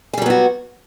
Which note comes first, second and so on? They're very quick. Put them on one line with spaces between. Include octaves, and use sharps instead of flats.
G#4 G3 F#3 B3 F#4